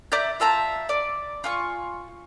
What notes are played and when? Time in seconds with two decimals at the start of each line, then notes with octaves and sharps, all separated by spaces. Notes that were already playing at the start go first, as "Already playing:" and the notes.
0.12 D5 E5 A#5 G6
0.40 F4 E5 A5 A#5
0.89 D5
1.44 F4 G#5 C#6